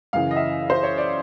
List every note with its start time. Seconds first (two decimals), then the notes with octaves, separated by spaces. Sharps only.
0.13 F#2 C#3 E3 F5
0.31 D#5
0.36 E5
0.70 C5
0.83 C#5
0.98 D5